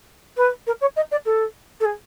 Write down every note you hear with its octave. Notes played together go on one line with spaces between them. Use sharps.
B4
A#4
C#5
D#5
D5
A4
A4
G#4